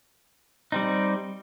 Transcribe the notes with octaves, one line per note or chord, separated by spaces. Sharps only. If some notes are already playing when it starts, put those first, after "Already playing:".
G3 C4 D#4